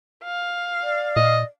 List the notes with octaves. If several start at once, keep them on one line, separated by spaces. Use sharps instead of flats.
F5
D5
A#2 D#5